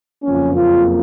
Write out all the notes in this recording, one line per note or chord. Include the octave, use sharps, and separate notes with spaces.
F#1 F2 C#3 F3 A#3 C#4
F4